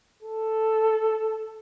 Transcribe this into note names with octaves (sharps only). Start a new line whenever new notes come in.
A4